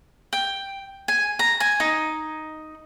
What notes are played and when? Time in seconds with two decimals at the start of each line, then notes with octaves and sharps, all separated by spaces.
0.33 G5
1.08 G#5
1.39 A#5
1.60 G#5
1.80 D#4